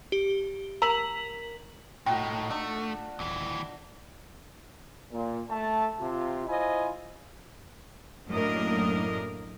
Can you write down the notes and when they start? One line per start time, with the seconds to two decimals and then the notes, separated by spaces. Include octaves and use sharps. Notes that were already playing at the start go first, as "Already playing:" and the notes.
0.12 G4
0.82 A#4 A#5 E6 B6 F#7
2.06 A2 D#4 F4 F#4 G5
2.51 A3 D4
3.19 D#1 D#2 E3
5.11 A#2
5.50 A3 A5
5.99 C3 F4
6.47 E4 F4 C5 D#5 G#5
8.29 F#2 A2 A#3 D4 A#4 D#5